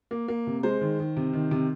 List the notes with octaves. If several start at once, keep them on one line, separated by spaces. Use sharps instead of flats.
A#3
A#3
C3
G#3 C5
D#3
D#3
C3
D#3
C3